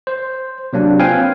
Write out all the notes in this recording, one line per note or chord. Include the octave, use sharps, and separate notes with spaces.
C5
C3 F#3 A#3 D4
C4 F4 B4 F5 G5 G#5